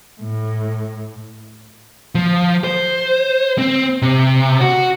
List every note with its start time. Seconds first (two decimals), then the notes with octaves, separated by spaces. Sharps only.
0.21 A2
2.15 F3
2.64 C5
3.58 C4
4.02 C3
4.61 F#4